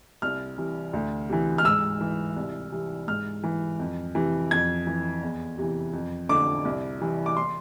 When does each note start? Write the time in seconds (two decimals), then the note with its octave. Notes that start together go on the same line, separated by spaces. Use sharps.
0.22 C2 F6
0.58 C3 E3
0.93 D2
1.29 C3 E3
1.58 F6
1.65 G#2 E6
2.01 E3
2.36 C2
2.72 C3 E3
3.08 G#2 F6
3.43 E3
3.79 F2
4.15 C3 E3
4.51 F2 G#6
4.87 E3
5.23 E2
5.58 C3 E3
5.93 F2
6.29 D3 D6
6.65 C2
7.01 C3 E3
7.26 D6
7.37 C6